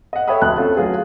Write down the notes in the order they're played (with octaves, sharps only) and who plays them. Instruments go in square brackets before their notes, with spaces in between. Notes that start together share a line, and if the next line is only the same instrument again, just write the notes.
[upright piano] D#5 F#5
A4 C#5 E5 G5 B5 D#6
F1 D2 A5 F#6
A3 C4 C#4 F4 A4
F#3 F4 G#4